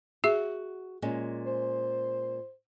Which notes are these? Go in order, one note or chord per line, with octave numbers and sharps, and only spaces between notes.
F#4 G#4 E5
A#2 G#3 C#4
C5